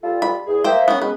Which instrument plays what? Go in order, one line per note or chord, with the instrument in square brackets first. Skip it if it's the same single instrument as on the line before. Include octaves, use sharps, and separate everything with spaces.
[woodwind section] G3 F4 A4
[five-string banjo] B5
[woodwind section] E2 G#4
[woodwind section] A#3 E5 [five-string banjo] C5 G5
[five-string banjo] B3 C#4
[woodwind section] G#3 B3 C#4 [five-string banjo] B4